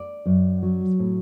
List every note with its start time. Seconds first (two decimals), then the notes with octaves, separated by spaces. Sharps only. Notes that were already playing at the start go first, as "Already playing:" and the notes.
Already playing: D5
0.26 F#2
0.63 F#3
0.99 A2